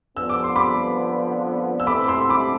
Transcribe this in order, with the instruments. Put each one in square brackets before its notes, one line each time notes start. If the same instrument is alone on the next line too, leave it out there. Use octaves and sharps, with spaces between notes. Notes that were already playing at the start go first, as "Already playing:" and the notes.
[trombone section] D3 F3 B3 [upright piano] E6
[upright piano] D6
C6
B5 D6
E6
[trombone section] D3 A3 C4 E4 A4 [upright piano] B5 D6
[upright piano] C6 E6
B5 D6